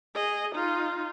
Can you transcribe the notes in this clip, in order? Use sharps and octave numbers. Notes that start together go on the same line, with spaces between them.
G#4 D#5
D#4 F4